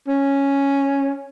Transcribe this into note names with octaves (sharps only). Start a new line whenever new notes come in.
C#4